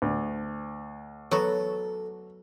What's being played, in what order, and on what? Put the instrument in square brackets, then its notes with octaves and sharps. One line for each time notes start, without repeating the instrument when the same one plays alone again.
[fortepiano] D2
[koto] F#3 B3 F#4 [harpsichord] A4